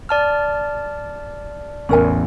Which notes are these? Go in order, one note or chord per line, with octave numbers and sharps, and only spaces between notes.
D5 A5 F6
A1 E2 C#4 A#4 G#5